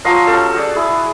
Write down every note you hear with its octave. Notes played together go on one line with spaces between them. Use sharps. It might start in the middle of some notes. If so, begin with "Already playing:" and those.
F3 F#3 D#5 C6
C#4 G4 A4
F#4 G#4 D5
E4 G#4